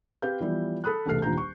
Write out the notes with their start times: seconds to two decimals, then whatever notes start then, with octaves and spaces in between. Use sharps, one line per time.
0.22 C4 G4 B4 F5 G6
0.40 E3 F3 G3 B3 E4
0.84 A4 B5 D#6 F#6
1.06 E1 C2 A3 A4 F6 C7
1.22 D#1 A#1 F4 A#5 G6
1.38 C#6